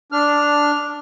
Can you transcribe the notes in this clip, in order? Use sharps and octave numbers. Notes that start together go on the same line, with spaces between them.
D4 F6